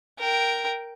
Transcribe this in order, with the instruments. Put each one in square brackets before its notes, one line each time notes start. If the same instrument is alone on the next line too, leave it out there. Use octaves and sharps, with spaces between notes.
[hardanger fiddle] A#4 G5